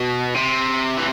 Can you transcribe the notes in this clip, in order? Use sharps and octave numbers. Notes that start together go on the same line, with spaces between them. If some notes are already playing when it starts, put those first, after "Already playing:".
Already playing: B2
C3
E3